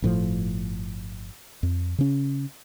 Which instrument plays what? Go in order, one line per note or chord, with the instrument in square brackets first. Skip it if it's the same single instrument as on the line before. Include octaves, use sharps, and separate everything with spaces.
[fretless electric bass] G1 A2 F3
F2
C#3 C#4